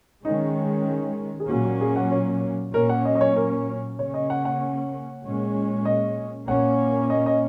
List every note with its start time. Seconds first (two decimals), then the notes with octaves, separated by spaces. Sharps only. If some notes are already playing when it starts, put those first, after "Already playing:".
0.24 D#3 G#3 C#4 D#4
1.40 G#4
1.49 A#2 F#3 A#3 C#4 F#4
1.65 F#4
1.81 G#4
1.96 F#5
2.11 C#5
2.73 A#2 F#3 A#3 C#4 A#4
2.89 F#5
3.05 D#5
3.15 D#5
3.21 C#5
3.36 A#4
3.98 C#3 A#3 C#4 C#5
4.14 D#5
4.30 F#5
4.45 F#5
5.24 A#2 G#3 C#4
5.85 D#5
6.47 A#2 A#3 C#4 F#5
7.10 D#5
7.26 D#5